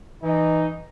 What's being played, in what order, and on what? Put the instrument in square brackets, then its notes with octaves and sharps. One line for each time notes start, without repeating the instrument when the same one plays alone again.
[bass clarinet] E3 [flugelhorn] D#4